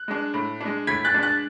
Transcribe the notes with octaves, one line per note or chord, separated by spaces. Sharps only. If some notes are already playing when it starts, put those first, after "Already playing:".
Already playing: F#6
G#3 D4
A2
G#3 D4
A2 G#6 B6
F#6 A6
G#3 D4
F#6 A6